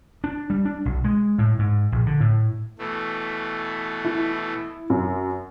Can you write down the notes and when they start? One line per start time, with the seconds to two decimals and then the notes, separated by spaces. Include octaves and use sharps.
0.24 D4
0.50 G3
0.65 D4
0.85 B1
1.04 G#3
1.38 A2
1.59 G#2
1.92 A#1
2.06 D3
2.20 A2
2.79 B2 E3 A3
4.05 E4
4.90 F#2